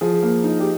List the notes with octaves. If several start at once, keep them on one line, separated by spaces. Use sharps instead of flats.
F3 G#4
A#3
D#4
G4